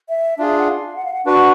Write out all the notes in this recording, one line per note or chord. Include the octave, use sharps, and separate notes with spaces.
E5
D4 F4 G#4 E5
F#5
F5
F#5
F5
F#5
D4 F#4 B4 F#5